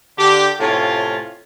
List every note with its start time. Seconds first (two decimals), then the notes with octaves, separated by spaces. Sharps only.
0.18 D3 G4
0.60 A2 C3 A3 C#4 F4